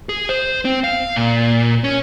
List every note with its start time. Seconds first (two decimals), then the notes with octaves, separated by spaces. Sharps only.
0.09 G#4
0.29 C5
0.65 C4
0.84 F5
1.16 A#2
1.84 C#4